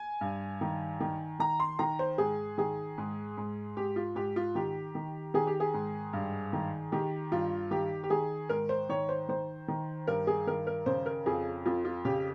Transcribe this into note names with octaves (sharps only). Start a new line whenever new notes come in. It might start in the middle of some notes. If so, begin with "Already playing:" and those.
Already playing: G#5
G2
D#3
D#3
D#3 A#5
C6
D#3 A#5
C5
G#2 G#4
D#3 G#4
G#2
G#2
G#2 G4
F4
G#2 G4
F4
D#3 G4
D#3
D#3 G#4
G4
G#4
G#2
G2
D#3
D#3 G4
G2 F4
D#3 G4
G4
D#3 G#4
G#2 A#4
C5
D#3 C#5
C5
D#3 C5
D#3
G2 A#4
G#4
D#3 A#4
A#4
C#3 C5
A#4
F2 G#4
F2 F4
F4
C#3 G4